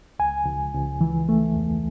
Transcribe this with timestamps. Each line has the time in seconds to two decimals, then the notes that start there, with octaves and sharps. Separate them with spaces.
0.19 C#2 G#5
0.46 C#2
0.74 C#2
1.01 E3
1.29 A3
1.55 E2